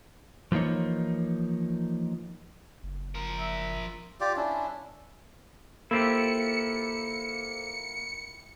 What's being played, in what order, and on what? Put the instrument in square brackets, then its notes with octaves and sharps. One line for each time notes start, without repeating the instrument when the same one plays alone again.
[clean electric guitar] E3 F3 A#3 D#4 C#5
[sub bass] F#1
[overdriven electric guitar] F3 A#4
[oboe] E5
[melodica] F4 G4 D5
C#4 D4 E4
[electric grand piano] A#3 [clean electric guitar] E4 F4 G4 [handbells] A4 C5 [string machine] C#7